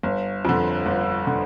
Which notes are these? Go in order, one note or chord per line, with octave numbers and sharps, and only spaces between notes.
G1
F2 D3
G1
D3